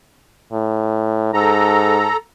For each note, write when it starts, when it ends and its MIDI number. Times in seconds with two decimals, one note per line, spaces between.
0.52 1.32 45
1.34 2.08 44
1.34 2.17 69
1.34 2.17 82